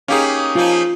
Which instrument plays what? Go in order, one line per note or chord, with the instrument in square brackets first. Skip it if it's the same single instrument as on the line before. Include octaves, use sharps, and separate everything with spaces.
[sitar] A#3 D#4 [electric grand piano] C#4 G4 G#4
[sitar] F3 A#3 D#4 [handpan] F4